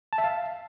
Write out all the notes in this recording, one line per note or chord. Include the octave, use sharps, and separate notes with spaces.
A5
E5
F5